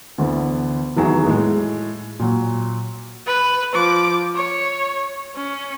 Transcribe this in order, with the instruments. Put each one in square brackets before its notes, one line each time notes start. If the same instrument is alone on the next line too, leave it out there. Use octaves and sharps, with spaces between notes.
[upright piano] D2 D3 E3 B3
F1 E2 D#3 F#3 E4 G#4
A2 G#3
A#2 F#3
[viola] B4
F3 D6
C#5
C#4